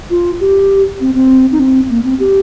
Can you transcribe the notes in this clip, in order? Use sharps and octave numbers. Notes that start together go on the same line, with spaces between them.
F4
G4
C4
C4
D#4
C4
A#3
C4
G4